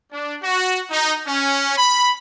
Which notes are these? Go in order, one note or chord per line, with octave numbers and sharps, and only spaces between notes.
D4
F#4
D#4
C#4
B5